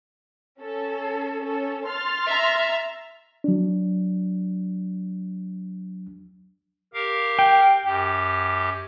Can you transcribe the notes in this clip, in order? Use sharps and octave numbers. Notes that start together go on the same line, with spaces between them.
C#4 A4
C#4 A4
C6 F6 A6
E5 A#5
F#3 D4
G4 A#4 F5
G5
F#2 G4